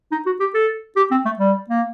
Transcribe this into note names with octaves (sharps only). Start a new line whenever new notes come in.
D#4
F#4
G4
A4
G4
C4
A3
G3
A#3